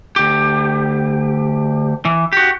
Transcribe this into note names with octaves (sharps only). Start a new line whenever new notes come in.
D2 G4
E3
F#4 G4